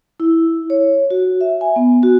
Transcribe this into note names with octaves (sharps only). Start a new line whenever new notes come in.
E4
C#5
F#4
E5
G#5
B3
F#4